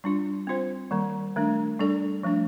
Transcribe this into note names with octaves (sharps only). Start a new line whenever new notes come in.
G3 D4 F4
C4 F4 C5
D#3 G3 A#3
D#3 A3 D4
G3 D4 A4 D5
F3 A3 D4